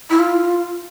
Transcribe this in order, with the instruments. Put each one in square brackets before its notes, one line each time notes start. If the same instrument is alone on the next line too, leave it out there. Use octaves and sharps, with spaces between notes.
[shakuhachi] E4
F4